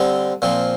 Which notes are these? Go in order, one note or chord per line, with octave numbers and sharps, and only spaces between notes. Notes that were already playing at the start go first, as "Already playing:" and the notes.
Already playing: D3 G3 C4
A#2 F3 C4